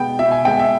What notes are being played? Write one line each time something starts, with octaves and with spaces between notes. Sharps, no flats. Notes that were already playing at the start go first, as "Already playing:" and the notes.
Already playing: B2 G#3 B3 G5
B2 E5
G#5
G#3 B3 G5
E5